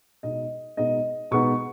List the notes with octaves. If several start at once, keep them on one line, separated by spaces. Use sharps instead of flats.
B2 G#3 B3 D#4 D#5
B2 G#3 B3 D#4 D#5
B2 G#3 B3 D#4 C#6